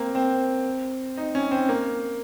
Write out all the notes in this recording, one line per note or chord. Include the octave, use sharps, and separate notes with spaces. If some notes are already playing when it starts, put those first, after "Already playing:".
Already playing: A#3 C4
C4
D#4
C#4
C4
A#3